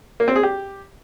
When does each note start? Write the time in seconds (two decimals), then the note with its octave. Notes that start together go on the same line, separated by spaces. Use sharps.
0.20 A#3
0.28 C4
0.36 G#4
0.43 G4